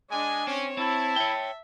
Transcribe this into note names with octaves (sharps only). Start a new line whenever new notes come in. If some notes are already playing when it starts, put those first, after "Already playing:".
G#3 D4 D#5 G#5
C4 C#4 C#5
C4 E4 A5
C#5 E5 G5